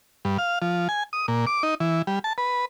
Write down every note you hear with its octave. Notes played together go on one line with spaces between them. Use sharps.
G2
F5
F3
G#5
D#6
A#2
D6
D#4
E3
G3
A5
B4